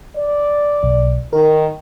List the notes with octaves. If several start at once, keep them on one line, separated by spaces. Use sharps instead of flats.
D5
B1
D#3 A#4